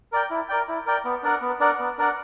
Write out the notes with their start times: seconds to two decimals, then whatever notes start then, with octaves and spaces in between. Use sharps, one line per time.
0.12 A#4 D5 G5
0.30 E4
0.49 A#4 D5 G5
0.68 E4
0.86 A#4 D5 G5
1.05 B3
1.23 D4 A#4 D5 F#5
1.41 B3
1.60 D4 A#4 D5 F#5
1.80 B3
1.98 D4 A#4 D5 F#5